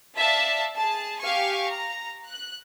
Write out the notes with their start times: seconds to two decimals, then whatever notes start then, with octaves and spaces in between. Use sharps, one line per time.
0.17 D5 E5 F5 A5
0.77 G#4 A5
1.20 G4 F5 G#5 C#6
1.69 A#5
2.30 F#6